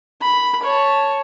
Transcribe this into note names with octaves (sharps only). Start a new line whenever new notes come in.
B5
C#5 A5